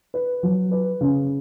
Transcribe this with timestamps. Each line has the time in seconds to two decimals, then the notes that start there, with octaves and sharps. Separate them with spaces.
0.14 B4
0.43 F#3
0.71 B4
1.01 C#3